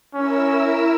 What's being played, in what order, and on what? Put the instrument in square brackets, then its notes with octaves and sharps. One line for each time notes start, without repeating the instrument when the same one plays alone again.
[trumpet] C#4 [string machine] E4 A#4 E6